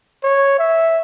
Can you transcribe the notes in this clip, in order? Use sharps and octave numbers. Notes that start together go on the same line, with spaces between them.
C#5
E5